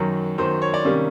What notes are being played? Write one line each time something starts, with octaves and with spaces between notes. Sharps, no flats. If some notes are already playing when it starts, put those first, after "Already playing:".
Already playing: F#2 D#3 F#3
F#2 D#3 F#3 C5
C#5
D5
C3 D#3 G3 A#3 C#4